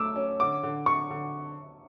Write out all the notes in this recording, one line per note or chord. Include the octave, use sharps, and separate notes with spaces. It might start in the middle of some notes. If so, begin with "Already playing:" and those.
Already playing: A3 D6 E6
C#4
D3 D6
D3
D3 C#6
D3